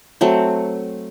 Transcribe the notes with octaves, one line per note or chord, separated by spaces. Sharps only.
F#3 A3 C4